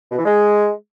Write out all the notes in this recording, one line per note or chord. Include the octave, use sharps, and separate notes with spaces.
B2
E3
G#3